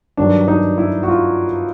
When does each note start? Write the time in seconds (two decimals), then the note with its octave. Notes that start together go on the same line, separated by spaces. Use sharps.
0.17 G2 D#3 F#3 D4
0.48 D#4
0.78 E4
1.03 F#4
1.08 F4